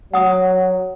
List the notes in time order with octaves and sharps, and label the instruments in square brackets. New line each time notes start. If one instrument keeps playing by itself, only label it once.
[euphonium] F#3 [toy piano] F#5 D#6